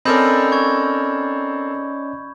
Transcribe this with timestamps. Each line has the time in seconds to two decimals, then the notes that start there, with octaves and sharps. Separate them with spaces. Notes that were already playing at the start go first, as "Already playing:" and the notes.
0.05 C4 C#4 A4 A#4 D5 D#5 B5 G6
0.52 C#6 G#6